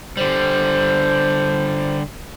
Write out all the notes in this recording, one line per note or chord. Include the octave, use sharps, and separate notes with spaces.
D3 G3 C5